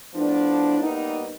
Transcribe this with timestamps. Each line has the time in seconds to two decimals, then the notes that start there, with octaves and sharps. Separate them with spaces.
0.14 A2 F3 B3 D4
0.79 G3 A#3 B3 D#4